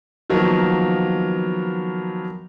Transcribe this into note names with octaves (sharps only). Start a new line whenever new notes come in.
D#3 F3 F#3 A#3 B3